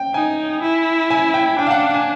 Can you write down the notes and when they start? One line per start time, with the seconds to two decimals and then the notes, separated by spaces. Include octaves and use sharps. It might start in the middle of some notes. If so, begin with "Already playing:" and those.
Already playing: G5
0.14 D#4 G#5
0.62 E4
1.10 G#5
1.34 G5
1.59 D4 G5
1.67 F5
1.71 F#5
1.83 F5
1.94 G#5